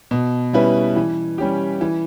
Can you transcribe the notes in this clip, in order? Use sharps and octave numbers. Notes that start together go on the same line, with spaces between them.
B2
G3 C#4 E4 B4
E3
G3 C#4 G4
E3